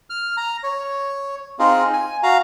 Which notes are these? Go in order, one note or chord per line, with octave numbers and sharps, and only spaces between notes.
F6
A#5
C#5
C4 D#4 F4 G#4
G#5
F#4 F5 A#5